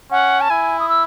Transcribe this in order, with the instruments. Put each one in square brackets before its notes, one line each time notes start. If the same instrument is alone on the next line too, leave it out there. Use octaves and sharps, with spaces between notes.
[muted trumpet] C#4 [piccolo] F#5
[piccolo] A5
[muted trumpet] E4 [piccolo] G#5
[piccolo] D#6
E6